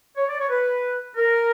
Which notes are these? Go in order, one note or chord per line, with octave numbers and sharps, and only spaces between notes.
C#5
D5
C#5
B4
A#4